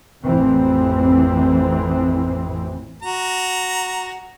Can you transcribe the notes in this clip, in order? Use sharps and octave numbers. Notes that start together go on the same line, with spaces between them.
A1 F2 E3 C4
F#4 A#5